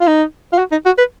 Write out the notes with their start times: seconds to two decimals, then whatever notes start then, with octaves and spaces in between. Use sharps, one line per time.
0.01 F4
0.07 D#4
0.53 F4
0.59 F#4
0.72 D#4
0.86 F#4
0.98 B4